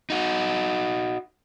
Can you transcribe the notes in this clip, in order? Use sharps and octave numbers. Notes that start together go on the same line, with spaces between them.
D#4 F#4